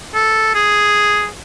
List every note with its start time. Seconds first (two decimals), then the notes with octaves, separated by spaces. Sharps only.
0.15 A4
0.55 G#4